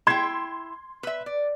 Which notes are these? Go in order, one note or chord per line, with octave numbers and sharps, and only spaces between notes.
E4 G5 C6 G#6 C7
B4 E5
D5